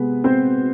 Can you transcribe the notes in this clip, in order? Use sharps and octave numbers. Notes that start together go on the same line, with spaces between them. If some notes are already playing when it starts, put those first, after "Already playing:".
Already playing: C3 G#3 B3 B4
C4 C5